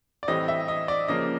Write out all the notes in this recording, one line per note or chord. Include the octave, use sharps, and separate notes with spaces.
D5
A2 E3 G3 C4 D#5
E5
D#5
D5
C#3 F3 A#3 D#5